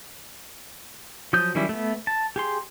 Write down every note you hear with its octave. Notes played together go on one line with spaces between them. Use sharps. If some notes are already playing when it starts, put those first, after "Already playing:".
F3 F#3 D#6 G6
D#3 F#3 G3 C#4 E4
A3 B3
A5
G4 G#4 C6